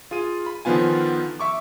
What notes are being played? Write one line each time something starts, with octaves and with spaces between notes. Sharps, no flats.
F4 G#4 D#7
B5
D3 D#3 F3 B3 F4 G#5
E5 C#6 D6